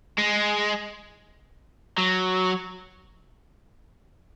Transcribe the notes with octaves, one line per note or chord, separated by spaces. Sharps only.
G#3
F#3